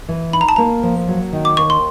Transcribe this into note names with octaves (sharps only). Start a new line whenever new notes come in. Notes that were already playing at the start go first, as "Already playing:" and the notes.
E3
D#4 B5
A#5
A5
A#3 A#5
F3
F#3
D#3
D6
D#2 C#6
C6